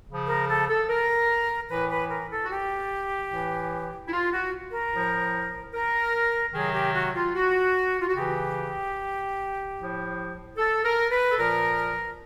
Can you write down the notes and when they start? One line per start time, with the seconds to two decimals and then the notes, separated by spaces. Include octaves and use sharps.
0.09 C#3 F3
0.29 A#4
0.50 A4
0.70 A4
0.89 A#4
1.70 A2 E3 B4
1.90 B4
2.10 A#4
2.31 A4
2.44 F#4
2.51 G4
3.31 A2 E3
4.08 E4
4.12 F4
4.33 F#4
4.73 A#4
4.92 A2 F3
5.74 A#4
6.54 C3 D#3 F#3 G#4
6.74 G4
6.95 F#4
7.15 F4
7.35 F#4
8.01 F4
8.08 F#4
8.15 C#3 E3 G4
9.77 A2 F3
10.58 A4
10.85 A#4
11.12 B4
11.30 A4
11.39 A#2 F3 A#4